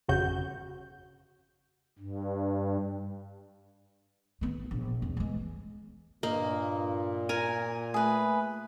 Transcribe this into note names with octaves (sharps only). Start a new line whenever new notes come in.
G1 F2 C#3 F#4 G6
G2
D#3 B3
A#1
E2
E3 G#3
G2 A#2 A#3 D#5
A#4 G#5
A3 G#4 B4